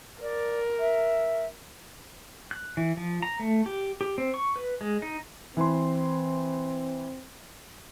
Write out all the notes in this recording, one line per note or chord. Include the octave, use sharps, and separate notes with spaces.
A#4 D5
E5
F#6
E3
F3
A#5
A3
G4
G4
C4
C#6
B4
G#3
D#4
E3 C4 B5 C6